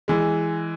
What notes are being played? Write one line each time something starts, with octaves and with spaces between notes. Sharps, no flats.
E3 G#3